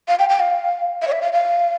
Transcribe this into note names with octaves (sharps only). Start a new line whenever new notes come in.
F5
G5
G5
F5
E5
C#5
E5
F5
F5